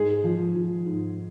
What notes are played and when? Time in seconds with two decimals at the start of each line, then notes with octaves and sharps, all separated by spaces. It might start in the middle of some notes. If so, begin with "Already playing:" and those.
Already playing: G#2 G#3 G#4
0.24 F3
0.55 F3
0.86 G#2